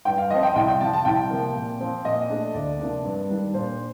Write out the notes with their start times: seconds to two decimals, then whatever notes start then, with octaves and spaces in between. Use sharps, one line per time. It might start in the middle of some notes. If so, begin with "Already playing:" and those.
0.05 G2 G5
0.18 F5
0.30 F3 C4 D#5
0.43 G5
0.55 C2 G5
0.68 G5
0.81 C3 F3 A5
0.93 A5
1.05 C2 G5
1.30 C3 F3 A#3
1.55 A#2
1.80 F3 C4
2.05 A#2 D#5
2.30 A3 D4
2.54 D2 D5
2.80 C3 F3 A#3 D4
3.04 G2
3.29 D#3 G3 D4
3.54 A#2 C5